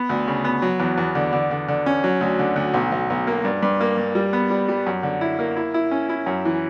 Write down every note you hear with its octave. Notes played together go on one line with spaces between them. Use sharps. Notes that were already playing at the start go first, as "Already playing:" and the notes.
Already playing: B3
D2
C#3
B3
F#3
E2
E2
D3
D3
D3
D3
C#4
F#3
D2
D3
D2
B1
B1
B1
A#3
G2
G2
A#3
G2
G3
B3
G3
G3
F#2
D3
E4
A#3
E4
E4
C#4
E4
F#2
E3